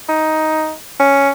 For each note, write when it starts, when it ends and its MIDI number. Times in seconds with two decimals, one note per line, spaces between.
0.09 0.73 63
1.00 1.30 61